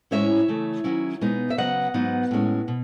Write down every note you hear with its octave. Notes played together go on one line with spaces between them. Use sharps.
A2 G#3 C#4 E4 C#5 E5
C#3 E3 A3
D#3 F#3 C#4 E4
B2 G#3 B3 D#4
E5
C#3 F#3 B3 D#5 F#5
G#2 F#3 B3 D#4
A2 G#3 C#4
B2